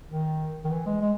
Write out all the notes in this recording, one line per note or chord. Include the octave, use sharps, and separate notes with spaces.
D#3
D#3
E3
G#3
G#3